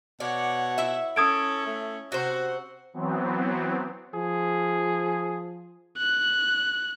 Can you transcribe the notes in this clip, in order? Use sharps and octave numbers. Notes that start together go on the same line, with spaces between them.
B2 C#5 D5 F#5
E4 E5
C#4 A4 D#6 G#6 D7
A3
C3 F#4 C5 F#5
E3 F#3 B3 C4
F3 G#4
F#6